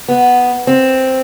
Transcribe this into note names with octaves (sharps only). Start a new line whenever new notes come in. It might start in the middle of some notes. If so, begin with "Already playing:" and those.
B3
C4